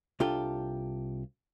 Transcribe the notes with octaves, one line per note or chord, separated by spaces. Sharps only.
C2 D4 F4 G4 A4 G5